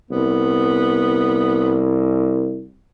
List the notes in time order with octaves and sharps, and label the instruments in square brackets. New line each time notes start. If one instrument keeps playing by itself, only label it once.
[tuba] C2 [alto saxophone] B3